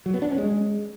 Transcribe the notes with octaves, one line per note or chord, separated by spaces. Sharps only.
F#3
B3
D4
C#4
G#3